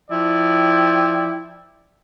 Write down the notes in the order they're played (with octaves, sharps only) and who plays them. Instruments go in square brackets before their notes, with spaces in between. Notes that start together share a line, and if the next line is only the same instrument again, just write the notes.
[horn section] F3 E4 D5 G5